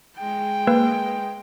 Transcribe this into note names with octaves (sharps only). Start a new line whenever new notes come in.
G#3 G5
A#3 B4